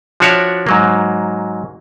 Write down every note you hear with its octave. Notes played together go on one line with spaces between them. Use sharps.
F3 D4 F#4 C#5 D5 E5
G#2 F#3 A#3